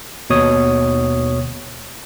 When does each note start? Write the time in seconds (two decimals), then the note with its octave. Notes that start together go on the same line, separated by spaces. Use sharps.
0.30 D#2 B2 C#5 D#6